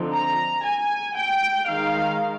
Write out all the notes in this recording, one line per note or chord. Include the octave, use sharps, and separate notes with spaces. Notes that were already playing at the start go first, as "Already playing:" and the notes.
Already playing: D3 F3 C4 D#4
A#5
G#5
G5
D#3 G#3 D#4 F5